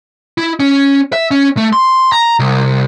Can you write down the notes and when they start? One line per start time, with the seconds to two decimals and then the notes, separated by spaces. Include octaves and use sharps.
0.38 E4
0.60 C#4
1.13 E5
1.31 C#4
1.57 A3
1.73 C6
2.12 A#5
2.39 C2